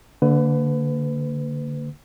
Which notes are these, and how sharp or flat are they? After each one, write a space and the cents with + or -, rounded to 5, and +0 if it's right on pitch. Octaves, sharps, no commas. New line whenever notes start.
D3 -10 A#3 -30 B4 +30